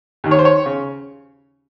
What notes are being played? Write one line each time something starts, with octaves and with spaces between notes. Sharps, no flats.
D#2 D#3
C#5
C5
C#5
C#3